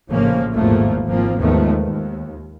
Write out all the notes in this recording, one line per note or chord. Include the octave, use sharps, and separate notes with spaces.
A#1 A2 C#3 F3 A#3 C#4
G#1 E2 A#2 F3 A3 A#3
G#1 F3 A#3 C4
D#2 D#3 F3 G#3 A3 B3
D#2